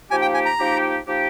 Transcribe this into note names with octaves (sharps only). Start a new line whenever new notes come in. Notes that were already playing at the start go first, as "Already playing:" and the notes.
F3 A#3 D#4 G4 G#5
G5
G#5
A#5
F3 A#3 D#4 G4
F3 A#3 D#4 G4